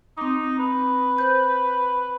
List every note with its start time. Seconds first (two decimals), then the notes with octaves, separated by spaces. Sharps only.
0.18 C4 D#4 D6
0.59 B4
1.18 C5 G6